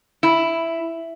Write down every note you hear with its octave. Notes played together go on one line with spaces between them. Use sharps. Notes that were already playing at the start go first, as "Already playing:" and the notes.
E4